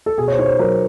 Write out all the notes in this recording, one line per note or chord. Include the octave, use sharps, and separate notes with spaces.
A4
B2 G#4
C#5
C5
D#4 C#5
C5
F#3 A#4